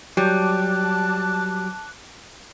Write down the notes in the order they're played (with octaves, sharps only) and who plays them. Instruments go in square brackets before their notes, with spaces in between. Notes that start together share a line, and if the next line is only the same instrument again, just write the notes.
[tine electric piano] F#3 [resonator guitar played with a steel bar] G3 [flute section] A5 D6 F#6